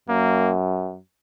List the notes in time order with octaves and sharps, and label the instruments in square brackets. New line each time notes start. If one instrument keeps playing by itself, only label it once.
[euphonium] F#2 [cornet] A#3